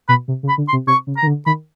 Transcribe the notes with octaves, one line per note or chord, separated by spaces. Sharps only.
B2 B5
C3
C#3
B5
D3
C6
C3
C3 C#6
C#3
A#5
D#3
D3
D#3 B5